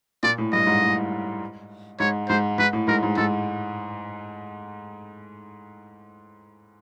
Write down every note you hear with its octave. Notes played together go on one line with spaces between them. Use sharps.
A#2 D5
A2
G2 D#5
G#2
A2
G#2 C#5
G#2 C5
G#2 B4
A2
G#2 A#4
G#2
G#2 A4